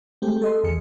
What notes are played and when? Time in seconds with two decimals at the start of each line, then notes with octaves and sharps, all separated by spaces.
0.22 G#3 A3 C4 G4
0.42 A4 D#5 C6
0.64 E2 G#4 C#7